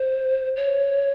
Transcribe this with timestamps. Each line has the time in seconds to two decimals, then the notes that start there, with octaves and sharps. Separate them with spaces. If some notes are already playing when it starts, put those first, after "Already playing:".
Already playing: C5
0.56 C#5